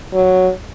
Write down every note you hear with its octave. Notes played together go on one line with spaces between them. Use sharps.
F#3